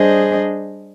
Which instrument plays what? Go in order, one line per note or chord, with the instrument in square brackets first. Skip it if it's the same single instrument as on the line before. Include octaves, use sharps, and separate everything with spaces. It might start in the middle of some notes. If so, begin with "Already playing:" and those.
Already playing: [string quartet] G3 D4 G#4 C5 D#5